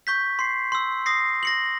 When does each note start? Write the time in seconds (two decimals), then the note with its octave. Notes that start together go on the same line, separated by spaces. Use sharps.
0.07 C#6 G6 B6
0.39 C6 C7
0.72 C6 E6
1.06 D#6 A#6 C7
1.43 A#6 C#7 F#7